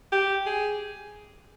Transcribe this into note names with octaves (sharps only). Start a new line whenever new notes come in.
G4
G#4